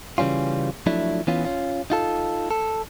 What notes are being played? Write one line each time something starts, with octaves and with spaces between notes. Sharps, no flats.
C#3 E3 G3 C#4 F4
F3 F#3 A3 D4 E4
E3 B3 C#4 F4
C#4 F4
D#4 F4 A4
A4